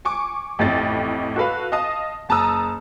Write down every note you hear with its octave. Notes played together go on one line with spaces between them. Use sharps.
G#5 C#6 D6
A1 F2 A2 A6
F#4 A4 B4 F5
D#5 F5 A5 D#6
F#1 A5 A#5 D#6 E6